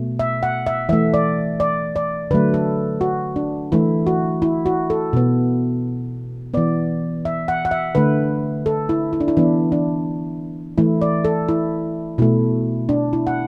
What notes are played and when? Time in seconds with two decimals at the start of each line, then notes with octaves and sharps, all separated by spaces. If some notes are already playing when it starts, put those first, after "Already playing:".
Already playing: B2 A3
0.19 E5
0.43 F#5
0.67 E5
0.89 E3 A3 E5
1.14 D5
1.60 D5
1.96 D5
2.31 D3 F#3 A3 B4
2.54 A4
3.01 F#4
3.36 D4
3.72 E3 A3 E4
4.07 F#4
4.42 E4
4.66 F#4
4.90 A4
5.13 B2 B3
6.54 E3 B3 D5
7.25 E5
7.48 F#5
7.65 F#5
7.71 E5
7.95 D3 A3 B4
8.66 A4
8.89 E4
9.13 E4
9.20 D4
9.28 E4
9.37 E3 B3 D4
9.72 D4
10.78 E3 A3 E4
11.02 D5
11.25 A4
11.49 E4
12.18 B2 A3 E4
12.89 D4
13.13 E4
13.27 F#5